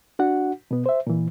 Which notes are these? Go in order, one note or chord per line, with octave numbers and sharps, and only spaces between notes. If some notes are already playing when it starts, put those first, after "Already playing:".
D4 F#4 F#5
B2 B3
C5 E5
A#2 E3